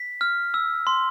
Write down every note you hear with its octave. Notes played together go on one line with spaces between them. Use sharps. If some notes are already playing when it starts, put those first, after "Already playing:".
Already playing: B6
F6
E6
C6